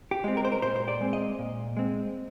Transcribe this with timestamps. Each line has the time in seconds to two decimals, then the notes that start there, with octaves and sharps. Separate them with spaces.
0.11 G4
0.24 G#3 C4
0.37 A#4
0.45 C5
0.52 A#4
0.62 A#2 C5
0.76 C5
0.88 D5
1.01 G#3 C4
1.13 D#5
1.39 A#2
1.77 G#3 C4